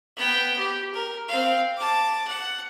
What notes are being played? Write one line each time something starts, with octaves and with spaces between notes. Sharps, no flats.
B3 G5
G4
A#4
C4 F5
A5 D6
F#5